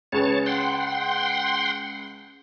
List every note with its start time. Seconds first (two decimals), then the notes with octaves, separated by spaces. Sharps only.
0.12 C#2 G#4 B4 C#5 A5
0.46 F#5 G5 C6